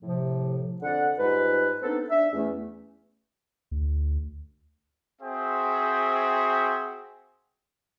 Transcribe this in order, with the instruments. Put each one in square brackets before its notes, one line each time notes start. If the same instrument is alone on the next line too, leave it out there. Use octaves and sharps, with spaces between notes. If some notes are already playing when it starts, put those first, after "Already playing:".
[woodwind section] A2 C3 F3
F2 D3 D5 F#5
G#2 G3 F4 B4
B3 C4 D4 D#4 A4
D4 E5
E2 A3 C#4
[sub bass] D2
[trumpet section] C4 F#4 G#4 C5 E5 G5